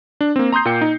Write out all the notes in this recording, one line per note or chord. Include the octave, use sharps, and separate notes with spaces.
D4
A#3 C4
A#5 C6 D#6 G6 C7
A#2 A#3 G5 C#7
D#4